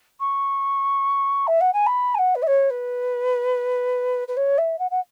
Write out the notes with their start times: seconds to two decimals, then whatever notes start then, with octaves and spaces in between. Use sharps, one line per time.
0.19 C#6
1.47 E5
1.61 F#5
1.73 G#5
1.86 B5
2.14 G#5
2.18 F#5
2.35 B4
2.42 E5
2.47 C#5
2.70 B4
4.28 B4
4.37 C#5
4.58 E5
4.78 F#5
4.90 F#5